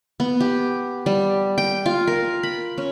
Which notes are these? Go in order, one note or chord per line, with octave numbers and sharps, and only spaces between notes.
B3
G4
G3
G5
F4
A#4
B5
C#4